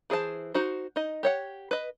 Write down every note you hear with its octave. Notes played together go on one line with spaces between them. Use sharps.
E3 G#4 C5 A5
D#4 F#4 C5
D#4 D#5
G4 C#5 F#5
B4 D#5